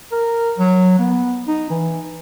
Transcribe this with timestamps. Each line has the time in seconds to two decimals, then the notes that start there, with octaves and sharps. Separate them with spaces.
0.12 A#4
0.59 F#3
0.99 B3
1.47 D#4
1.70 E3